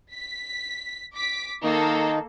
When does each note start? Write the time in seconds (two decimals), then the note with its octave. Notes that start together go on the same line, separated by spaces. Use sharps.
0.14 B6
1.15 D6 B6
1.63 D#3 A#3 D#4 A4